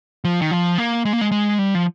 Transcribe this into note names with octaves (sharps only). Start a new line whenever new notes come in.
F3
D#3
F3
A#3
G#3
A#3
G#3
G#3
G3
F3